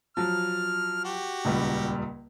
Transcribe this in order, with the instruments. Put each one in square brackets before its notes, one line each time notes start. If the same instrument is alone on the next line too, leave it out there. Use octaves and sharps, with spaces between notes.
[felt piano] F3 F#3 [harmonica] F6
[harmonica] F#4 G4
[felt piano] D#1 C#2 G3